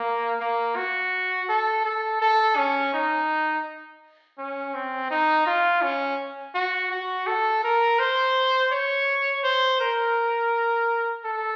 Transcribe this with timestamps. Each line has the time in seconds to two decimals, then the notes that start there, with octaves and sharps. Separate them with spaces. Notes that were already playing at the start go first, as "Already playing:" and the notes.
Already playing: A#3
0.41 A#3
0.76 F#4
1.49 A4
1.85 A4
2.22 A4
2.57 C#4
2.94 D#4
4.38 C#4
4.74 C4
5.11 D#4
5.47 F4
5.82 C#4
6.55 F#4
6.92 F#4
7.27 A4
7.64 A#4
7.99 C5
8.72 C#5
9.44 C5
9.80 A#4
11.25 A4